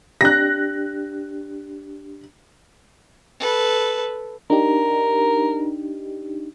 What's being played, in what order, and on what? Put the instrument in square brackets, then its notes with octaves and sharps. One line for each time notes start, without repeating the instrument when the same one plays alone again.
[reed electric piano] D4 G4 [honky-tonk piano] F#6 A#6
[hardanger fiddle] A4 B4
[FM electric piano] D4 D#4 G4 [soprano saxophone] A#4